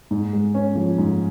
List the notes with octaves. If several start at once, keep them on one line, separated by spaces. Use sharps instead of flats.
G#2
G#3
C#4
F3
G#2